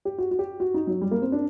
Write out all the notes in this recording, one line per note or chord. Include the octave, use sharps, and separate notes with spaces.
G4
F#4
F#4
G4
F#4
D#4
F#3
G3
A#3
C4
D4